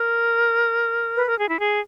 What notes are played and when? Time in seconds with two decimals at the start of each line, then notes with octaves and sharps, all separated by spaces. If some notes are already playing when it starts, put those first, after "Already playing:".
Already playing: A#4
1.15 B4
1.26 A#4
1.37 G#4
1.47 E4
1.58 G#4